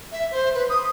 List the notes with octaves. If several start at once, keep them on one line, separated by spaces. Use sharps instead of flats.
E5
C5
B4
D#6